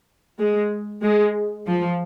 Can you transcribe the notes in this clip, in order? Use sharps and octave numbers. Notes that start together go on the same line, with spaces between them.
G#3
G#3
F3